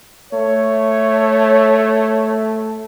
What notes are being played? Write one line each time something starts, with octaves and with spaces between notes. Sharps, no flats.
A3 C#5